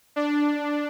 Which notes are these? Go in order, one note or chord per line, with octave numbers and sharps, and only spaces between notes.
D4